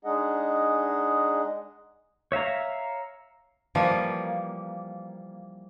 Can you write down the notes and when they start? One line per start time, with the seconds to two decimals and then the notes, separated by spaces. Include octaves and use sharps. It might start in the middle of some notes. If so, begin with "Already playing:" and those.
0.05 G#3 D4 D#4 G#4 D#5 F#5
2.32 C#5 E5 F5 A#5
3.75 E3 F3 G3 A#3